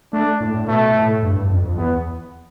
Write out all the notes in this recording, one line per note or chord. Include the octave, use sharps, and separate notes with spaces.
A3 D4
A2
A2
B2 A3
A2
G2
G2
F2
F2
E2 B3